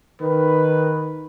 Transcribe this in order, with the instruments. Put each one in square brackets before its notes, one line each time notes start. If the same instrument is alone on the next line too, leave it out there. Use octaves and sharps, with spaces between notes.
[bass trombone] D#3 [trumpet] B4